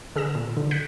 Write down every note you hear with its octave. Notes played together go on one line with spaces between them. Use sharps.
D3 G#4 E6 A#6 E7
A#2
D3
F#6 G6 A#6 B6 C#7 D7